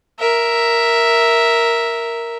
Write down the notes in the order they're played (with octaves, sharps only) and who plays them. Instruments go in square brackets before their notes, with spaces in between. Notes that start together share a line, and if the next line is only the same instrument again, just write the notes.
[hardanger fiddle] A#4 E5